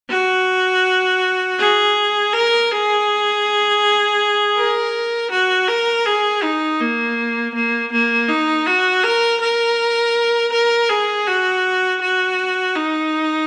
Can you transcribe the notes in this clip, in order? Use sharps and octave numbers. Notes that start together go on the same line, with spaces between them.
F#4
G#4
A#4
G#4
A#4
F#4
A#4
G#4
D#4
A#3
A#3
A#3
D#4
F#4
A#4
A#4
A#4
G#4
F#4
F#4
D#4